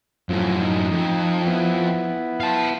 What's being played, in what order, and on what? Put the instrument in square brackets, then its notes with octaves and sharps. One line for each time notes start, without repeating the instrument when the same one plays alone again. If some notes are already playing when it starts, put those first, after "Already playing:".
[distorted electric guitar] F#2 A2 [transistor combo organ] F3
[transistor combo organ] D#4
[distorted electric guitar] F2
[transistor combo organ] B3 E4
[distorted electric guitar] F5 A5